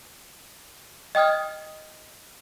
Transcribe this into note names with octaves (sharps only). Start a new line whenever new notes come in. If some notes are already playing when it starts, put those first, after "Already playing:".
D#5 G5 D#6 F6 G#6